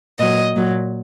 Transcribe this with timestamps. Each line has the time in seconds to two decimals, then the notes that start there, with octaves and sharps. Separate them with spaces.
0.19 A#2 F#3 D#5
0.55 A#2 F#3